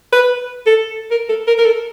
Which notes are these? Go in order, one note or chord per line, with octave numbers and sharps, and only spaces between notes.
B4
A4
A#4
A4
A#4
A#4
A4